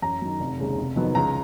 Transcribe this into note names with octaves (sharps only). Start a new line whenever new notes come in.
F#2 A#5
D#3 F#3
F1
D#2 C#3 G#3
F1
F2 D#3 F#3 B3
C#2 A#5